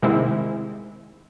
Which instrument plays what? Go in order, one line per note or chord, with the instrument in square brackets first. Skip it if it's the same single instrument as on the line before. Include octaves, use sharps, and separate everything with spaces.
[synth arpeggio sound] C3 D#3 G#3 C4 E4